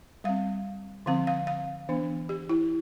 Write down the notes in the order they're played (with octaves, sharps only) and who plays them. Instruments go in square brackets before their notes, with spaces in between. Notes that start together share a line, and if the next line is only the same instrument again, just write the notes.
[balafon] G3 C4 F5
D3 F3 C4 F5
F5
F5
E3 B3 D4
G4
E4